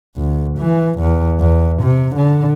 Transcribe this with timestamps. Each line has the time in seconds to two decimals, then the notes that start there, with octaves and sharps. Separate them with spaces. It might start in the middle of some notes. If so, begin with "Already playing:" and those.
0.17 D2
0.59 E3
1.00 E2
1.40 E2
1.83 C3
2.16 D3